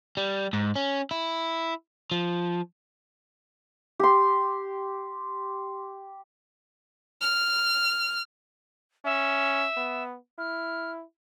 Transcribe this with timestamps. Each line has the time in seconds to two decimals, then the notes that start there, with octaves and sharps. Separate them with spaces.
0.17 G3
0.53 G#2
0.76 C#4
1.11 E4
2.11 F3
4.00 G4 C6
7.21 F6
9.05 C#4 E5
9.77 B3
10.38 E4 F6